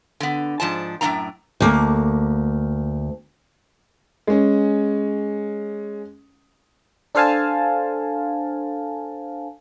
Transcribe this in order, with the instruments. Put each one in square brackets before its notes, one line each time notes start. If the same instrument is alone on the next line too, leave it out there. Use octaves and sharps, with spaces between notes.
[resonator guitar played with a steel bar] D3 B3
G#2 F3 D4 A5
F#2 A2 E3 C4 D4 A#5
[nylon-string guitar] D2 A#3
[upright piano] G#3 C#4
[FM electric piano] D4 A4 C5 F5 G#5 A5